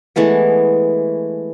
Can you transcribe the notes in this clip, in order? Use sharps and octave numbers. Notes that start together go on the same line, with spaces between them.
E3 G#3 A3 B3